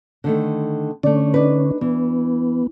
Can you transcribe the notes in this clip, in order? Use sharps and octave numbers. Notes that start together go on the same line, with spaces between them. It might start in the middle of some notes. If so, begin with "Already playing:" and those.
D3 D#3 A3
D3 A3 C#4 D5
D4 D#4 B4
E3 B3